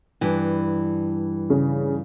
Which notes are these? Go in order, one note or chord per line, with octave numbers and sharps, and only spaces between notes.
G2 E3
C#3